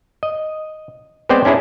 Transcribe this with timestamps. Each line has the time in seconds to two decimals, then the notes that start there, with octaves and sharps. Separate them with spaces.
0.23 D#5
1.29 G#3 B3 C4 C5 D5 G5
1.45 C#4 D4 E4 G#4